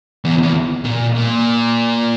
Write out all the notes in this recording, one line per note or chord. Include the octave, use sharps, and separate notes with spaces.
E2
E2
A#2
A#2